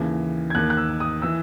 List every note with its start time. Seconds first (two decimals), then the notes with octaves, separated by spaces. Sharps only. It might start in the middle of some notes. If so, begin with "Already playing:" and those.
Already playing: D#2 C#3 E3
0.50 G#6
0.55 D#2 D#3 F#6
0.70 F#6
0.77 E6
1.00 D#6
1.22 E3 E6